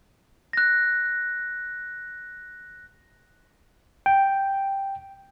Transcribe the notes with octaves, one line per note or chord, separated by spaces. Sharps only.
F#6 A#6
G5